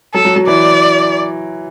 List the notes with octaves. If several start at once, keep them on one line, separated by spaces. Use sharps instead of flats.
F#3 A4
F#3
F#3
E3 D5